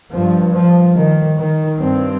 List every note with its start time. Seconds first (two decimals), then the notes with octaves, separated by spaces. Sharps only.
0.11 G2 F3
0.53 F3
0.95 D#3
1.37 D#3
1.78 G2 C4